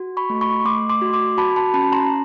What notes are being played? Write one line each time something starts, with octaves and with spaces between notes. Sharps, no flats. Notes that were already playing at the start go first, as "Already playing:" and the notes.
Already playing: F#4
B5 C#6
A3
B5 C#6
A3 C6 D6
C6 D6
F#4
C6 D6
F#4 A5 B5
A5 B5
C#4 A5 B5
A#5 C6